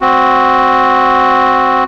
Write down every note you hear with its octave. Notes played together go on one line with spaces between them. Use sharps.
C4 F#4